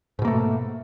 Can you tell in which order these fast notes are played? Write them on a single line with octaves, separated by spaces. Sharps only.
G#2 B2 A#3 A3